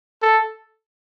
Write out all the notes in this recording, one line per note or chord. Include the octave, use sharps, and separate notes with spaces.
A4